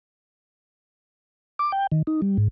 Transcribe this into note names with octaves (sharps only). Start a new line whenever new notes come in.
D6
G5
D#3
D#4
G3
G#2